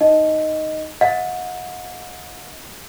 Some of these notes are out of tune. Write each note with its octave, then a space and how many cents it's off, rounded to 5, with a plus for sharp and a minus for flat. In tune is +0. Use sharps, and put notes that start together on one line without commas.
D#4 +0 D#5 +0
D#5 +35 F#5 -35